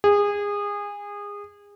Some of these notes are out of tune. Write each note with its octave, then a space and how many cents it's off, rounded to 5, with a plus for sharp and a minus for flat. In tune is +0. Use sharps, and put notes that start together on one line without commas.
G#4 -25